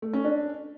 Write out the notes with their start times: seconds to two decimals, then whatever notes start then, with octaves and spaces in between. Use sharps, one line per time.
0.02 A3
0.13 C#4
0.25 D4